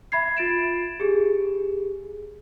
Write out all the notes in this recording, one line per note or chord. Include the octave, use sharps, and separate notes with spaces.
E5 B5 G#6 C7
F4 A6 D7 E7
G4 G#4